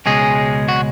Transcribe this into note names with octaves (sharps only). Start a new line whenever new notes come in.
C#2 B2 G#3 C#4 G#4
F#4